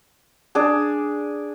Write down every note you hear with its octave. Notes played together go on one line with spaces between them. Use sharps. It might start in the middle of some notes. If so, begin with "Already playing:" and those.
D4 G#4